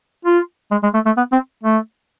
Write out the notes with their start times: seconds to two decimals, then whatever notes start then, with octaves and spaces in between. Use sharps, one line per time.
0.25 F4
0.71 G#3
0.83 G#3
0.94 A3
1.06 A3
1.17 B3
1.32 C4
1.63 A3